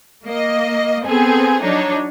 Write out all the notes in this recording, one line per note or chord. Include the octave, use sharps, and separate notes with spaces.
A#3 D#5
B3 C4 G#4 A4
F#3 D4 D#4 C#5